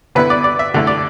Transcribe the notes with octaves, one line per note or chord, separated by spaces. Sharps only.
D3 B3 E4 B4
D5
D5
E5
D3 A3 E4
D5